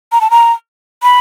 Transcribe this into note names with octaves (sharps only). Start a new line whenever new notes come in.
A#5
A5
A#5
B5